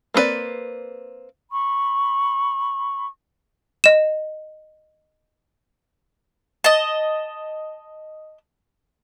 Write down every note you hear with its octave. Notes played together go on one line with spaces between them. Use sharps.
A#3 C4 D#4 B4 D5
B5 C#6
D#5 E7
D#5 A5